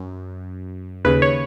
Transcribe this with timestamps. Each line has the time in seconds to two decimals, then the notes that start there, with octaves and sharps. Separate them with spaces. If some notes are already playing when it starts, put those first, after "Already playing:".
Already playing: F#2
1.05 D#2 C#3 B4
1.22 C#5